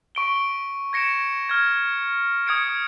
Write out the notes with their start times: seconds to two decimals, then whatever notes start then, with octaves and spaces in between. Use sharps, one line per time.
0.15 C#6 D7 G7
0.93 G#6 A#6 C#7 D7 E7
1.49 F6 G#6
2.47 D#6 G#6 C#7 D7